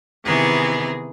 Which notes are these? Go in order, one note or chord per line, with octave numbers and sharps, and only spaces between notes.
C3 D#3 E3 B3 G#4